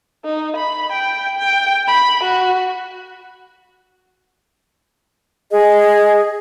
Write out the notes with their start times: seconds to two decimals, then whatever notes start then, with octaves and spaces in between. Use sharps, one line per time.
0.24 D#4
0.56 B5
0.92 G5
1.39 G5
1.87 B5
2.24 F#4
5.51 G#4 D#5